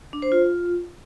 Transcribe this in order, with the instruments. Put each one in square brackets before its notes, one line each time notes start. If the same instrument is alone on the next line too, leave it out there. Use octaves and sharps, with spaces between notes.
[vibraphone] D4
C5
F4